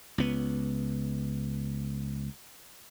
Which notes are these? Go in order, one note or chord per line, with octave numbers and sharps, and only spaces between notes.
C#2 B3